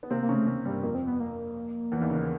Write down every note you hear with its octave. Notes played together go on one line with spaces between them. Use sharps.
B3
C3 A#3 C4
A#3
C#3 C#4
A3
C#3 A#3 C#4
G2 G3
F2 F3 A#3
C4
B3
A#3
E2 E3
D#2 D#3
C#3